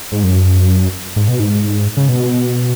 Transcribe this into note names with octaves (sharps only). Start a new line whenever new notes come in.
G#2
F#2
G#2
B2
G#2
C#3
B2